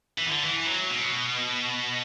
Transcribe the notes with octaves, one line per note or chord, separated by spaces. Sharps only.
E3
D3
E3
F#3
B2